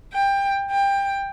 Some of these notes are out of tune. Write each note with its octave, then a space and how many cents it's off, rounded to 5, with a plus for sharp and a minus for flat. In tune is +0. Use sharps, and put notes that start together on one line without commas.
G5 +20
G5 +20